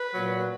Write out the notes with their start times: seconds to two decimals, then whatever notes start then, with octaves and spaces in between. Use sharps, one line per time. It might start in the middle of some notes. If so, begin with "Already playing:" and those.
Already playing: B4
0.10 A#2 F#3